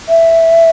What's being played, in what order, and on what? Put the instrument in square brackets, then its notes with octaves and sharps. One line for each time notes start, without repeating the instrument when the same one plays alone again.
[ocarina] E5